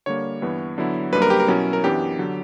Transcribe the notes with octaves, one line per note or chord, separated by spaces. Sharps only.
D3 G3 A#3 C#5
G2 E3 B3
D3 F#3 B3 E4
F#2 D3 G3 A#3 B4
A#4
G4
A#4
B2 F#3 C#4 E4
A#4
F#2 E3 B3 D4 G4
D3 F#3